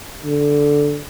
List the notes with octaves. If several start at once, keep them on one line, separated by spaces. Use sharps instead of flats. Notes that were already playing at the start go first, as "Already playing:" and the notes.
D3